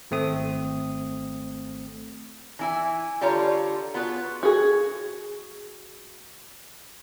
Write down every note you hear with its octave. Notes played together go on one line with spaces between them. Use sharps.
G#1 A3 C4 D#6
E3 E4 G#5
D3 G3 F4 C#5 A#5
B3 F4 F#4 G#4 B4
F#4 G#4